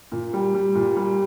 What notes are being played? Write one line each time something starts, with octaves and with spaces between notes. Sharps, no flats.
A#2
G3
G3
A#2
G3